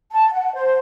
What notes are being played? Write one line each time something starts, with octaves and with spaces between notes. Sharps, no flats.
A5
F#5
C5